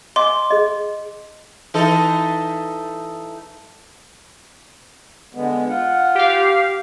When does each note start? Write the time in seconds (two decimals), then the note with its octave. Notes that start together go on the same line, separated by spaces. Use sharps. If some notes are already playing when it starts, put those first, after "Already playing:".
0.16 D#5 G#5 C6 D6
0.50 G#4 D#5
1.74 E3 D#4 A4
5.35 D3 G#3 B3
5.68 F4 F#5
6.15 G4 F5